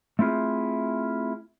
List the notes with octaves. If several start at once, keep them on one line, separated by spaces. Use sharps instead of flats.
A3 C4 E4 F4 G#4